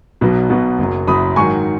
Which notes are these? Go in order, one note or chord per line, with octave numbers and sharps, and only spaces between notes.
B1 B2 F#3 B3
B1 B2 F#3 B3
F#1 F#2 F#3
F#1 F#2 F#3 B5 D#6
G#2 D#3 F#3 G#5 C#6